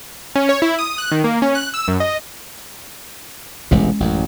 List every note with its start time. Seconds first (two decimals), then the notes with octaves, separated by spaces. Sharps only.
0.35 C#4
0.49 C#5
0.62 E4
0.79 D#6
0.98 F#6
1.11 D#3
1.24 A#3
1.42 C#4
1.55 F#6
1.74 E6
1.88 F#2
2.00 D#5
3.71 E1 A1 C3 G#3 C#4
4.00 A1 F#2